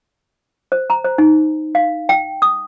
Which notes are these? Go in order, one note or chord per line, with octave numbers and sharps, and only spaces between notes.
C5
A#5
C5
D#4
F5
G5
D#6